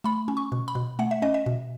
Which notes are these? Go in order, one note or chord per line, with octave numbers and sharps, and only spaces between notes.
A3 B5
C#4
C#6
B2
B5
B2
A3 F#5
E5
C#4 D#5
E5
B2